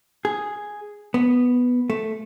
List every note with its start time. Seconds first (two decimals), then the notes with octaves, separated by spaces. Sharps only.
0.25 G#4
1.14 B3
1.90 A3